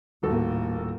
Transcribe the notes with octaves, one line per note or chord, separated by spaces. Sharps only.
D#1 A2 A#3 F#4 A4